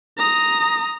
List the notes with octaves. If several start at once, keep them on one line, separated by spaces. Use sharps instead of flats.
A#5 D#6